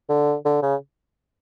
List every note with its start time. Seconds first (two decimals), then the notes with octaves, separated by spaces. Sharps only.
0.09 D3
0.45 D3
0.62 C#3